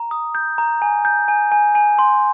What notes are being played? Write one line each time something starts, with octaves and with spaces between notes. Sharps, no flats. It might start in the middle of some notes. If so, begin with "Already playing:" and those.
Already playing: A#5
D#6
G6
A#5
G#5
G6
G#5
G#5
G#5
C6